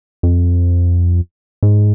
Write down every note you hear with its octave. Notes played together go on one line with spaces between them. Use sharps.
F2
G#2